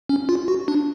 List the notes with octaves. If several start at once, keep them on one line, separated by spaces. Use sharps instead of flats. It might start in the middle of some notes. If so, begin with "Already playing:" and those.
C#4
F4
F#4
D4